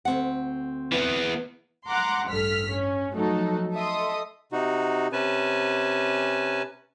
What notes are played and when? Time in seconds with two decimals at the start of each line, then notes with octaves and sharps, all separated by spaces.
0.05 D2 C4 F#5
0.92 E3 B3
1.87 F#5 A#5 C6 D6
2.28 A1 G2 A4 F6 B6
2.68 C#4
3.12 F3 F#3 A3 D#4 F#4 A4
3.74 A4 D#5 E5 C6 D#6
4.52 C3 D#4 F#4
5.12 C3 C#4 B4 G#5 A5